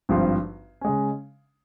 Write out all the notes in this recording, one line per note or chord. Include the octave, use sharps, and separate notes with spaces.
G#1 G2 F3 C4 F4
C#3 G#3 C#4